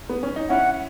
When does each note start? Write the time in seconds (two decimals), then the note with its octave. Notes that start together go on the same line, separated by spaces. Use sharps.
0.09 B3
0.23 C#4
0.36 D#4
0.49 C#4 E4 F#5